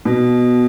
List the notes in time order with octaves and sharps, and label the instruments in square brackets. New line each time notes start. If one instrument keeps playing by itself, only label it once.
[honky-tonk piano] B2